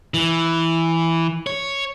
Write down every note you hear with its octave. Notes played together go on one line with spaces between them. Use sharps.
E3
C#5